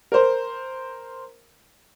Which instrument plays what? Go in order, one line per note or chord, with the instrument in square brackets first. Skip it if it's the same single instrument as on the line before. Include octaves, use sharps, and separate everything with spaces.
[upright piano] A#4 C5